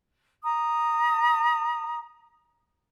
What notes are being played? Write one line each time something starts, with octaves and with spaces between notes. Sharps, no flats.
A#5 D#6